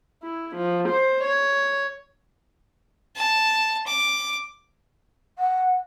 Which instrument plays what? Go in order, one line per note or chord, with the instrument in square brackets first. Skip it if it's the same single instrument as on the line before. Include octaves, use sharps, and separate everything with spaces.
[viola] E4
F3
C5
C#5
[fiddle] A5
D6
[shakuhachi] F#5